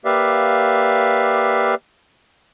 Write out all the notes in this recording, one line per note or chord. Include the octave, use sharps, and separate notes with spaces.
A#3 G4 B4 D5 E5 F5